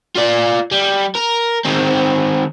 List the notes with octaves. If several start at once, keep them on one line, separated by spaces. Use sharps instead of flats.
F4 D5
G3
A#4
D#3 C4